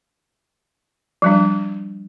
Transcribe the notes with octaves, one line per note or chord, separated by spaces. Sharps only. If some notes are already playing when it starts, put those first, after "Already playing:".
F3 G3 D4